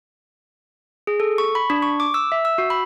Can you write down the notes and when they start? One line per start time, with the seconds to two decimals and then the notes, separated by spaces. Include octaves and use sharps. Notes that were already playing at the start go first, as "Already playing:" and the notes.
1.07 G#4
1.20 A4
1.38 C#6
1.55 B5
1.70 D4
1.82 C#6
2.00 D6
2.14 E6
2.32 E5
2.45 E6
2.58 F#4
2.70 B5